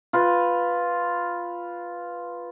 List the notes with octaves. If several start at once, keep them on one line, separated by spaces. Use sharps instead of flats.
F4 B4